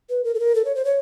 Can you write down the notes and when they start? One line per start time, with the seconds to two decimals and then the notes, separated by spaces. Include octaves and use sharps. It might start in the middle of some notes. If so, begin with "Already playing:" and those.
0.09 B4
0.24 A#4
0.35 A4
0.40 A#4
0.55 A4
0.65 C#5
0.75 C5
0.85 C#5